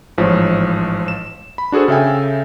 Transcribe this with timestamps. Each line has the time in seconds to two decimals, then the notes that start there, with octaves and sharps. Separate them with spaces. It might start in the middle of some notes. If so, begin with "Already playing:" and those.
0.18 A1 G#2 F3 C#5
1.08 E7
1.58 B5
1.72 D4 F#4 G#4 A4 C5
1.88 C#3 A4 E5 G5 G#5